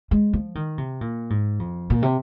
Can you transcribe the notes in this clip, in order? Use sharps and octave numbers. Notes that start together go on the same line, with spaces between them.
G#3
F3
D#3
C3
A#2
G#2
F2
A#2
C3